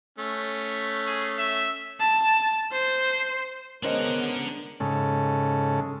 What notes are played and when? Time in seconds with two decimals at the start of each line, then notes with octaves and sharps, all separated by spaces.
0.19 A3 C#4
1.07 G#4
1.38 E5
2.00 A5
2.72 C5
3.83 G#3 B3 C#4 D4 A#4 C5 D#5 F#5
4.80 G#2 C#3 A4